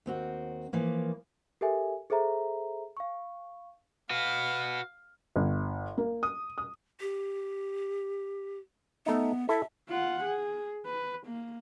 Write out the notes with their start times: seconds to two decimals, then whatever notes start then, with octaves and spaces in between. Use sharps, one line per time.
0.06 D#2 C4 F#4
0.73 E3 F3 A#3
1.61 G4 A4 A#4 E5 G#5
2.10 G#4 A4 C5 E5 A#5
2.97 F5 C#6
4.10 F#4 B4 F5
5.36 G1
5.98 A#3
6.23 D#6
6.58 D#6
7.00 G4
9.06 A3 B3 D#4
9.49 E4 A4 E5
9.89 F4 F#5
10.24 G#4
10.86 B4
11.27 A#3